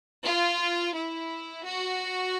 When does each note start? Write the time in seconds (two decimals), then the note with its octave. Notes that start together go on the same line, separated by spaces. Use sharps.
0.25 F4
0.95 E4
1.66 F#4